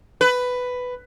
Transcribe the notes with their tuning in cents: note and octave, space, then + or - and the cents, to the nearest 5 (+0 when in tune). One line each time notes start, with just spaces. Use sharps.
B4 +10